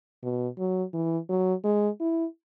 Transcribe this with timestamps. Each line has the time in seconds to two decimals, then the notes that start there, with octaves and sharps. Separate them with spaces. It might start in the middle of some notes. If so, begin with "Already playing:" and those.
0.23 B2
0.59 F#3
0.93 E3
1.29 F#3
1.64 G#3
2.00 E4